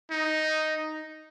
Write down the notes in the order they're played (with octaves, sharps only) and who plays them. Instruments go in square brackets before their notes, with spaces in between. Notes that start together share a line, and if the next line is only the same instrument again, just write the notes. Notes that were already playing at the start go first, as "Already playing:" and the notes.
[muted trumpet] D#4